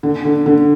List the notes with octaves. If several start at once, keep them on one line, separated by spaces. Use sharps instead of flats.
D3
D3
D3